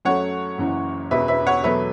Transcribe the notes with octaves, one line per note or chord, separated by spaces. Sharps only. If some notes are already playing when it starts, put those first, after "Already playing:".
F#2 F#3 A3 C#5 F#5
F#1 F#2 E3
E1 E2 B2 B4 E5
B4 E5
C#5 F#5
E2 B2 F#3 A3 B4 E5